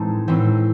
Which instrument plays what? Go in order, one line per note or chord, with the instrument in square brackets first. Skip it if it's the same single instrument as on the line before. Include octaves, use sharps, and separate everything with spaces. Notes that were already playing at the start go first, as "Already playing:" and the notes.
Already playing: [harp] A2 E3 G#3 C4 D#4 A5
A2 E3 C4